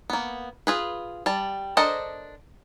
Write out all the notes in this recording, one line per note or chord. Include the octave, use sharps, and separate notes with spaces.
A#3 B3
F4 G#4 B4
G3 A5
D4 A4 A#4 C5 D#5